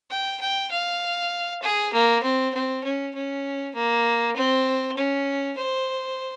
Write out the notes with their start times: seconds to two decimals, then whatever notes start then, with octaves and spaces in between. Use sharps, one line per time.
0.10 G5
0.41 G5
0.71 F5
1.62 G#4
1.93 A#3
2.23 C4
2.54 C4
2.84 C#4
3.14 C#4
3.75 A#3
4.36 C4
4.97 C#4
5.57 C5